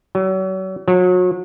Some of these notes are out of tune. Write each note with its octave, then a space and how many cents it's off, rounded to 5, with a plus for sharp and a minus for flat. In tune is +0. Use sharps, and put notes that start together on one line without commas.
F#3 +35
F#3 -35